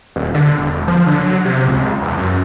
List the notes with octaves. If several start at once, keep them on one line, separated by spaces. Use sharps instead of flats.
D#1
D3
E1
F3
D3
F#3
C3
C#2
E2
F#2